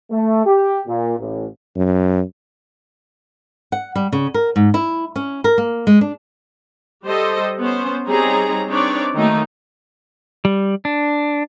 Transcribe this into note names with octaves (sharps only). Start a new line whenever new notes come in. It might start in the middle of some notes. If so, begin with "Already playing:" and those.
A3
G4
A#2
A1
F#2
F#5
G3
C#3
A#4
G#2
E4
C#4
A#4
A#3
G#3
D4
G3 G4 A4 C5 D#5
B3 C#4 C5
G3 C4 D#4 G#4 C#5 A#5
C4 D4 D#4 B4 C#5 D5
D#3 F#3 A3 A#3 D#4
G3
D4